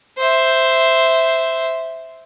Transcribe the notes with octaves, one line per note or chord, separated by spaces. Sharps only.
C5 E5